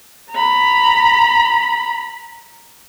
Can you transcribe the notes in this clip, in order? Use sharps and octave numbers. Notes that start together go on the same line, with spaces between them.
A#5 B5